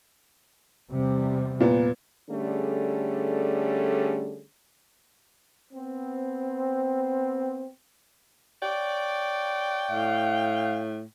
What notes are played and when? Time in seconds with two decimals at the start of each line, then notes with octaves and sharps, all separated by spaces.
0.91 E2 C3 G3
1.60 A#2 B3
2.30 D3 G3 A3 C#4 G#4
5.72 B3 C4
8.62 C#5 D5 G5
9.91 A2 F5